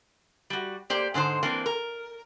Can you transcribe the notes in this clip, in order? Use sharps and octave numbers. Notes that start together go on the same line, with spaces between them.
G3 F#4
A#3 G4 C5 D5
G#2 D3 G#3 C5
E3 A#3 C4 D4
A#4